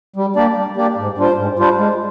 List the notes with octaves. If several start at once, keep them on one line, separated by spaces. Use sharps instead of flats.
G3
A#3 D4 G4 D5
G3
A#3 D4 G4 D5
G#2
G3 D4 F4 C5
G#2
G3 D4 F4 C5
G#3